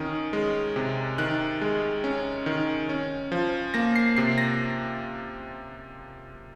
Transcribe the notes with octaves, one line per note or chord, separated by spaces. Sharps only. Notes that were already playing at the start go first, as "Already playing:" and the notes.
Already playing: D#3 C#4 D#6
G#3
C3
D#3 F#6
G#3
C#4
D#3
C#4
F3
A#3 A#6
C7
C3 C7
A#6